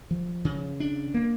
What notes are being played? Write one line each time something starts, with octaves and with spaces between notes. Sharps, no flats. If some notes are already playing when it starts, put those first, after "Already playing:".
F3
C#3
D4
A#3